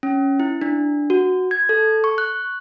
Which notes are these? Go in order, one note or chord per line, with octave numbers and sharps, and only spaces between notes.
C#4
E4
D4
F#4
G#6
A4
C#6
F#6